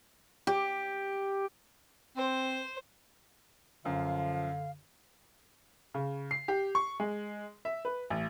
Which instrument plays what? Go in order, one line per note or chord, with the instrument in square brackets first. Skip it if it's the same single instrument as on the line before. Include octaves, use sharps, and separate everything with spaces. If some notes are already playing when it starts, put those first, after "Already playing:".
[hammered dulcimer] G4
[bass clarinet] C4 [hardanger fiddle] C5
[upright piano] F#2 [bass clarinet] D3 [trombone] F3 [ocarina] F5
[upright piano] C#3
C7
G4
C#6
G#3
E5
B4
A1